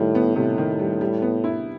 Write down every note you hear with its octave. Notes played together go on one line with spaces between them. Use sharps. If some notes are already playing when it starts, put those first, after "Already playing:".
Already playing: A2 D#3 G3
B3
A2 C3
D#3
G3
G3
B3
E4